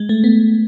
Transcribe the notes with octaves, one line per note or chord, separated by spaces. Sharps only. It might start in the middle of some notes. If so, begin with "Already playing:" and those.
Already playing: G#3
A3
B3